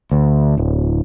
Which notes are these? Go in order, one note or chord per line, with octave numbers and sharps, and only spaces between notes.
D2
D1